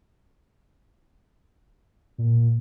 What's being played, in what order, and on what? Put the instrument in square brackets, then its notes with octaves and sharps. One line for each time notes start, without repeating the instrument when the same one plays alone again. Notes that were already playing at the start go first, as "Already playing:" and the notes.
[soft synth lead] A#2